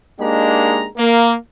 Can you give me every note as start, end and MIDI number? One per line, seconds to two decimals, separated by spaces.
0.20 0.87 56
0.20 0.87 58
0.20 0.87 62
0.20 0.87 63
0.20 0.87 67
0.20 0.87 82
0.97 1.34 58